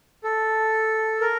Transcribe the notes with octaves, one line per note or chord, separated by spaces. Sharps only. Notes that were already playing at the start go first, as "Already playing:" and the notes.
A4
A#4